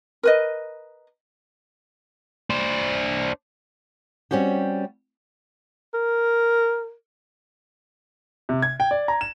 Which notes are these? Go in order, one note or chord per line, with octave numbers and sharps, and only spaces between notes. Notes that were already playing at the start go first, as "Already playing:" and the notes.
A#4 B4 D#5
D4 C5
G3 C4 C#4 F#4 G4
A#4
C3
G#6
G5
D5
A#5
E7